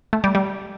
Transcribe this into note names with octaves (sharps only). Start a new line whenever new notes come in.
A3
G3
G3